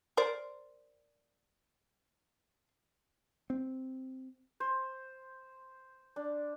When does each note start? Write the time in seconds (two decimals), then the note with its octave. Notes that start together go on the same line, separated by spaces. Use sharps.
0.17 A#4 C5 D5
3.50 C4
4.60 C5
6.16 D4